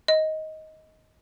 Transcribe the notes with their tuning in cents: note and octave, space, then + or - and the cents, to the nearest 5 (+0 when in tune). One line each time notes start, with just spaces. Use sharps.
D#5 +15